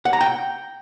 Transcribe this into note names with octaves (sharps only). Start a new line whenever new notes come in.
F#5
A#5
G5